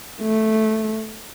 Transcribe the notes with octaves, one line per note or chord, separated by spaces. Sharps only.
A3